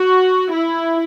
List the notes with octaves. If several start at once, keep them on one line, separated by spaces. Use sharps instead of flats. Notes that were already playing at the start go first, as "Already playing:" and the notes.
Already playing: F#4
E4